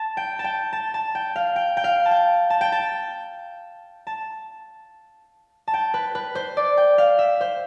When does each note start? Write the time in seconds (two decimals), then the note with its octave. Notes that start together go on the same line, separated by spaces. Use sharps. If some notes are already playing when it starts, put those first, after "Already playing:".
Already playing: A5
0.17 G5
0.39 A5
0.44 G5
0.73 A5
0.94 A5
1.15 G5
1.36 F5
1.56 G5
1.77 G5
1.84 F5
2.06 A5
2.11 G5
2.50 A5
2.61 G5
2.72 A5
4.07 A5
5.68 A5
5.74 G5
5.94 B4
6.15 B4
6.35 C5
6.57 D5
6.77 G5
6.98 F5
7.19 E5
7.41 C5